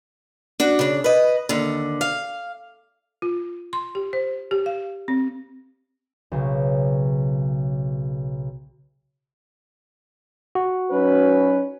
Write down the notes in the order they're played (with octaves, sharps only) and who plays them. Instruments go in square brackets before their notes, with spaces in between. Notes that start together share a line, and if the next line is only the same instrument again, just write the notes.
[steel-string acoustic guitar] D4 F#4
C#3 D4
B4 D#5
D#2 D3
F5
[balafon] F4
C6
G4
C5
G4
F5
C4
[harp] B1 C#3
[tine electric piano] F#4
[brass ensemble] F#3 D#4 B4 [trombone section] C#4